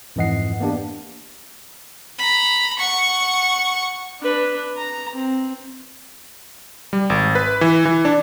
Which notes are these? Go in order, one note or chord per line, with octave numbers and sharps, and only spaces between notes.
F2 G#2 E3 D#5 F#5 C7
A#3 B3 D4 G4
A#5 B5
F#5 C#6
D4 B4
A#5
C4
G3
G#1
B4
E3
E3
D4